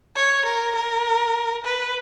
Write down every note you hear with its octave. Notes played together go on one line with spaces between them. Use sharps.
C#5
A#4
A#4
B4